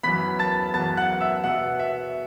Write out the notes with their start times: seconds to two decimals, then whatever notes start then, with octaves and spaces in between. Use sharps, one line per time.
0.03 F#2 E3 B3 B5 B6
0.39 A5 A6
0.74 F#2 E3 B3 A5 A6
0.97 F#5 F#6
1.21 E5 E6
1.44 B2 B3 F#5
1.79 E5